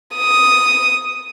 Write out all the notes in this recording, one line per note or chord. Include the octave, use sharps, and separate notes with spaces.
D#6